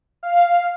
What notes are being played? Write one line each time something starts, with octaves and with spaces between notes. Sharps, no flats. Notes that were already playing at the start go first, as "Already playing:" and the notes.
F5